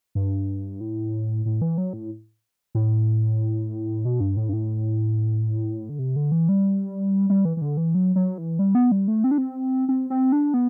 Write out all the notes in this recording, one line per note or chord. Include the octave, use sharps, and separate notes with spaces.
G2
A2
A2
E3
F#3
A2
A2
B2
G2
A2
G2
A2
D3
C3
D3
E3
G3
G3
E3
E3
D3
E3
F#3
F#3
E3
G3
B3
G3
A3
C4
D4
C4
C4
C4
D4
B3